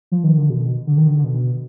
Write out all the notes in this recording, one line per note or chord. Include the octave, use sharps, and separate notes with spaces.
F3
D#3
D3
B2
D3
D#3
D3
D3
B2